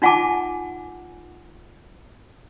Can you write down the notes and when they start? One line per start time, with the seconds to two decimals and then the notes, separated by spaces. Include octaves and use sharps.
0.02 D#4 F4 F#5 G#5 A5 D6